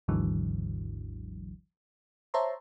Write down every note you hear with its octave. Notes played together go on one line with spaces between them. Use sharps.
G#1 D#2 G#2 D3 E3 F#3
C5 C#5 E5 A5 A#5 C6